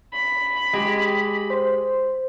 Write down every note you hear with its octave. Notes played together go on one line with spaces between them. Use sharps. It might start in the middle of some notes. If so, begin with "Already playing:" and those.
B5
G#3 G4
C5